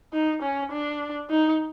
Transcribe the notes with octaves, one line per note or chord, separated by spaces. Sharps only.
D#4
C#4
D4
D#4